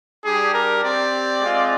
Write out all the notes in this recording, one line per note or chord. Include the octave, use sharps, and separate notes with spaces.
G3 D4 G4 G#4
A#4
C4 G4 D5
G#3 C4 F4